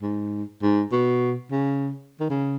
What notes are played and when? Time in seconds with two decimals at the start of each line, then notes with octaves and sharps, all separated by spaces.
0.02 G#2
0.62 G#2
0.92 B2
1.51 C#3
2.20 D#3
2.30 C#3